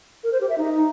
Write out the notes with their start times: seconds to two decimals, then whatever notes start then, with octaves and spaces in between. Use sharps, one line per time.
0.24 A#4
0.32 C5
0.41 G4
0.49 E5
0.58 D#4